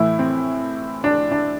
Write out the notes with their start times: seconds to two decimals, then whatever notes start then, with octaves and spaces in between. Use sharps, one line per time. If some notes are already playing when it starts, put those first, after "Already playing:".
Already playing: A2 E3 A3 E4
0.19 C4
1.04 D4
1.32 D4